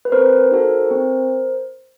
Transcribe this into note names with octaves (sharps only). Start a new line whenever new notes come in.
B4
C4 A#4 C5
D#4 F#4 A4
C4